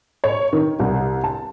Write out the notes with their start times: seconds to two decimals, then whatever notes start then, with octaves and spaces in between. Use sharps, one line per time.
0.24 C#5
0.53 D#3
0.80 C2
1.24 A5